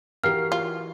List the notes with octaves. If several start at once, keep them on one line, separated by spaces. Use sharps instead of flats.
E3 F#4 G4 A#4 F5 F6 C7
F4